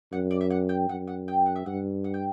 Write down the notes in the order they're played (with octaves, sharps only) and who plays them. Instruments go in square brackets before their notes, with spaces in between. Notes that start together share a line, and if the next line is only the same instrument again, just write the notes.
[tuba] F#2 [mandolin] F#5
[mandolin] D5
E5
F#5
G5
[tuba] F#2 [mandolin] F#5
[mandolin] F#5
G5
F#5
E5
[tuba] G2 [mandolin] F#5
[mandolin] F#5
G5